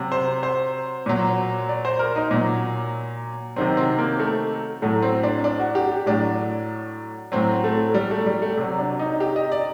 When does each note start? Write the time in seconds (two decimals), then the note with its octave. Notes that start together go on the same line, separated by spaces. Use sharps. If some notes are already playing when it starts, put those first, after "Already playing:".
Already playing: C3 F#3
0.12 C5
0.43 C5
1.06 A#2 F#3
1.69 D5
1.85 C5
1.99 A#4
2.16 D#4
2.31 A#2 F#3
3.56 C3 D#3 F#3 C4
3.77 C4
3.98 A#3
4.19 A3
4.82 A2 F#3 A3
5.02 C4
5.23 D4
5.44 D4
5.59 F#4
5.75 G4
5.91 G4
6.06 A2 F#3 D4
7.32 A2 F#3 C4
7.64 A3
7.94 G3
8.11 A3
8.26 G3
8.42 A3
8.57 C3 F#3
8.78 D4
8.99 D#4
9.20 G4
9.36 D#5
9.52 D5